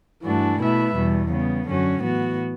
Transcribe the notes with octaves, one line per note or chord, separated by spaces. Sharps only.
G2 E3 A3 D4 F#4
B2 A3 E4 B4 E5
E2 B2 G3
C#3 G3 B3
F#2 D3 F#3 C#4 F#4
A2 E3 B3 F#4